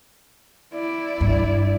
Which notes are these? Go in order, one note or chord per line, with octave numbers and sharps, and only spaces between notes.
E4 D5
G2